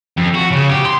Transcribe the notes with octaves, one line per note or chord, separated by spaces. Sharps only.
F2
F#4
C#3
G4
C6